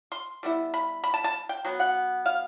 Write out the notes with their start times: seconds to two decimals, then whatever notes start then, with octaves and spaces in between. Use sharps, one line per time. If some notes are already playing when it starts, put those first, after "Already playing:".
0.12 C6
0.43 G3 B3 E4
0.74 B5
1.04 B5
1.14 A5
1.24 A5
1.49 G5
1.65 F#3 B3
1.80 F#5
2.26 F5